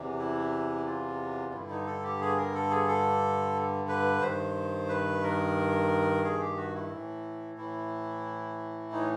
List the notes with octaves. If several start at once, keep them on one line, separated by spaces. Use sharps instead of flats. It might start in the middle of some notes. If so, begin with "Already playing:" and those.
Already playing: E2 C3 E3
E4
F4
G2 D3 E4
D#4
A4
G4
G#4
A#4
A4
G#4
A4
B4
G2 D#3 C5
B4
A#4
G#4
G4
F#4
E4
A2 E3
E4
D#4